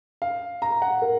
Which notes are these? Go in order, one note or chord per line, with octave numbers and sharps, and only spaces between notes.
F5
A#5
F#5
A#4